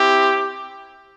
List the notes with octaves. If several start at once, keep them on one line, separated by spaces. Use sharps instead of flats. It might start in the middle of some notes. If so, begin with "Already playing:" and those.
Already playing: C4 E4 G4